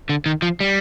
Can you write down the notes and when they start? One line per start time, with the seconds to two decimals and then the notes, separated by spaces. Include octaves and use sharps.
0.09 D3
0.26 D#3
0.42 F3
0.60 G3